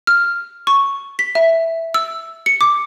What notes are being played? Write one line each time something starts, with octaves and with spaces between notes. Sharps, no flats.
F6
C#6
B6
E5
E6
C#7
D6